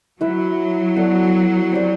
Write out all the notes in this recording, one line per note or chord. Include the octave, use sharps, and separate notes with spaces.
F#3 E4 B4 E5
B3 F#4 A4 D5
C4 G4 D5